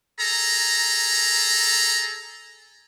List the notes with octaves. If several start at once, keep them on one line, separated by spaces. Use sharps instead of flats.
G#4 A4 A#5